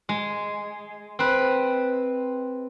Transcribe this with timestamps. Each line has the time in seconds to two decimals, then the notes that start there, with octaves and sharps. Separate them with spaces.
0.09 G#3
1.19 C4 B4